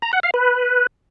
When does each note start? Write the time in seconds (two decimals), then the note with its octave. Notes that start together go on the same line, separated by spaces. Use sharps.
0.02 A#5
0.13 F#5
0.23 F5
0.34 B4